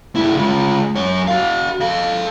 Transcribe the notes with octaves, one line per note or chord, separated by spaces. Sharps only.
G2 E4
G#3 F4
F#2 C#5
F#4 F5
A4 F5